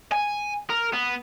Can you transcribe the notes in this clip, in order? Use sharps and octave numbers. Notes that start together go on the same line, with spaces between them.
G#5
A#4
B3